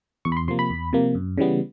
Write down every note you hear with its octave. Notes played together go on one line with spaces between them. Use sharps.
E2 C#6
B5
C6
C3 F3 A#3 C6
B5
E2
C3 F3 A#3
F#2
C#3 E3 G3 B3